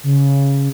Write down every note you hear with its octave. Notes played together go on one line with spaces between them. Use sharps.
C#3